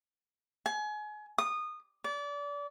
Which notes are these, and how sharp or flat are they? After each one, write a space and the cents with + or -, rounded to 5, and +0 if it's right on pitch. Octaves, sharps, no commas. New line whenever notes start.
G#5 +30
D#6 -20
D5 -30